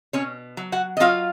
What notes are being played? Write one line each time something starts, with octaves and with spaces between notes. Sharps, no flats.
B2 C#4 C#5
F#3
F#4 F#5
D#5
F#3 F4 F5